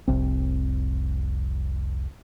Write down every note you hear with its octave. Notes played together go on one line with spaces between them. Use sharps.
F1 C2 C4